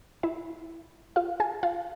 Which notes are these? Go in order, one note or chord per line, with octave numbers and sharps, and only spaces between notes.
E4 E5
F4 F5
G#4 G#5
F4 F5